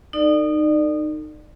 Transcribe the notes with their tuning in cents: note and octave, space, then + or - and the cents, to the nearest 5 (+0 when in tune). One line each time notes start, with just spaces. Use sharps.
D#4 -20 A4 +35 D5 +25